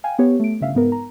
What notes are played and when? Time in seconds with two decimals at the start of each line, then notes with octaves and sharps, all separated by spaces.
0.04 F5 G5 G#5
0.19 B3 G4 C#5
0.40 A3 D7
0.61 G1 C#3 E5 F5
0.75 G#2 B3 A#4
0.92 A#5